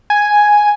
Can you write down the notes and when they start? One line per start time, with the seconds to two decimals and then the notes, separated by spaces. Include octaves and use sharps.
0.10 G#5